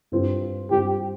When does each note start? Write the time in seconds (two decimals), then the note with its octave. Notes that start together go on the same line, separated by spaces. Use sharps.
0.12 G2 G3 C4 F4
0.71 G2 G3 C4 F4 G4